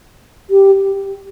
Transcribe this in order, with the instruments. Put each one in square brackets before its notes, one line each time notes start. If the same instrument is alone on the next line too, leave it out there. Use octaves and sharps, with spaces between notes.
[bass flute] G4